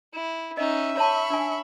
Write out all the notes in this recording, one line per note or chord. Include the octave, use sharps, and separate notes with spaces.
E4
C#4 D#4 D#5 E5
C#5 A5 B5 C#6
D4 G#5